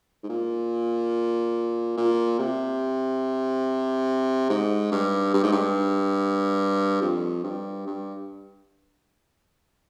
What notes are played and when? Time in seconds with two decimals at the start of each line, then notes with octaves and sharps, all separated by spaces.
0.23 G#2
0.29 A#2
1.97 A#2
2.39 C3
4.50 G#2
4.91 G2
5.34 G2
5.43 G#2
5.52 G2
7.02 F2
7.44 G2
7.87 G2